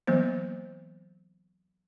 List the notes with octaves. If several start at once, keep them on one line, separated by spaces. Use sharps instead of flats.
E3 F#3 A#3 B3 C5